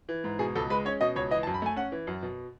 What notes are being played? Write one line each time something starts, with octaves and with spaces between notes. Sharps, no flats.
E3
G#2
B2 G#4
C#2 A4
G#3 B4
C#4 C#5
B2 D#5
C#2 C#5
E3 D#5
A5
F#2
B5
A3 G#5
C#4 F#5
E3
F#2
B2